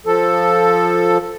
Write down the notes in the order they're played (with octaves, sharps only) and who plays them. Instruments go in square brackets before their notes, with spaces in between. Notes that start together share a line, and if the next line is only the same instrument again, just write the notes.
[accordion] F3 A4